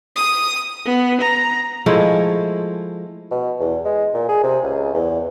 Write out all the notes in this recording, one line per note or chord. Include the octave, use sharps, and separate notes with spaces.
D#6
B3
A#5
F3 G#3 A3 E4
B2
E2
G#3
A#2
G#4
C3
C#2
E2